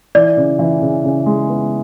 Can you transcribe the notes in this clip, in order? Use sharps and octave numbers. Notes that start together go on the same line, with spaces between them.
E3 D5
C#3
E3
C#3
C#3
G#3
B3